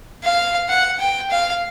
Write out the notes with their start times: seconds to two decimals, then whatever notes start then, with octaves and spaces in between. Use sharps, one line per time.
0.24 F5
0.69 F#5
1.00 G5
1.30 F5